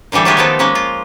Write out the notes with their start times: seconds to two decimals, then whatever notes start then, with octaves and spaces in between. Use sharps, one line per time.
0.12 A#2 D3 E3 G3 A4
0.25 F#3 G#3 A3 F4 G4 G#4
0.37 D#3 F3 B3 F4 A4
0.59 G#3 A#3 C#4
0.75 F4